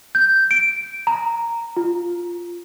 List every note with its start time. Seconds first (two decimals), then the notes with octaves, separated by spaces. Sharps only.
0.15 G6
0.51 D7
1.07 A#5
1.77 F4